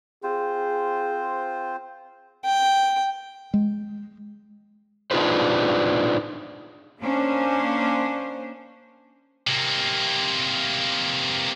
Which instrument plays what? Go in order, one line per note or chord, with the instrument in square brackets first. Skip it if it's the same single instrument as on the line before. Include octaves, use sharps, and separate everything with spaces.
[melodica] C4 F4 C5 [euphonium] G#4
[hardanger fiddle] G5
[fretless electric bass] G#3
[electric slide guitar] D4 D#4 F4 G#4 B4 C5
[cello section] A#3 C#4 D4 C5
[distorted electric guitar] C3 A#3